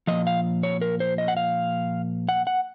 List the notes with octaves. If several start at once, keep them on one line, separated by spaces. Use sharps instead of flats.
A#2 F3 D#5
F5
C#5
A#4
C5
D#5
F#5
F5
F#5
F#5